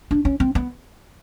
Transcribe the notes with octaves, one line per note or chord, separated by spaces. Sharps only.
D4
C#4
C4
B3